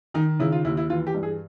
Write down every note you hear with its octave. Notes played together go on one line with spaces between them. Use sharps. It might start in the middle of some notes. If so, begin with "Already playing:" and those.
D#3 D#4
C#3 E4
F4
D#2 E4
E4
E3 F4
G4
G2
G#4